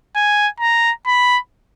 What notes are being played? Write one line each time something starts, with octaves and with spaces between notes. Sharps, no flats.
G#5
A#5
B5